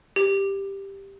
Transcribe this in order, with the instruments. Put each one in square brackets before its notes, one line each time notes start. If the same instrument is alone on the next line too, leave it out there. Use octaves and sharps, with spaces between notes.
[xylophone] G4